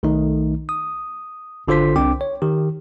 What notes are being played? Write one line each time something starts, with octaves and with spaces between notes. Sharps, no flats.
B1 D#3 A3 D#4
D#6
G#1 D3 F4 C5 C6 B6
C2 C4 D4 G5 D6
C#5
D#3 G4